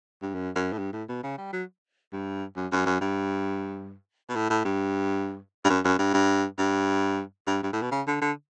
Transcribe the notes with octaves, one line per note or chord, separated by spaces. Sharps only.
G2
F#2
F#2
A2
G2
A2
B2
C#3
G3
F#3
G2
F#2
F#2
F#2
G2
B2
A2
A2
G2
G2
F#2
F#2
G2
G2
G2
G2
G2
A2
B2
C#3
D3
D3